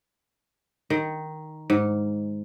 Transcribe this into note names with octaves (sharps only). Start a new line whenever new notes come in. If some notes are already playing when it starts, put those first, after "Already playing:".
D#3
G#2